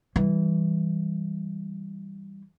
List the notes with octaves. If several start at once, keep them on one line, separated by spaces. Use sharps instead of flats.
E3 G3